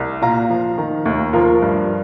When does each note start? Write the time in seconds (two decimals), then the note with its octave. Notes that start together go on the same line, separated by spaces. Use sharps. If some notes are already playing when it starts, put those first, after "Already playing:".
Already playing: C2
0.22 A#2 F5 A#5
0.50 F3
0.78 D#3
1.05 D#2
1.33 F3 F4 A#4
1.62 G2